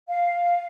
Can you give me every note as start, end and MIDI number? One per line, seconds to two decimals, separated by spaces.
0.08 0.66 77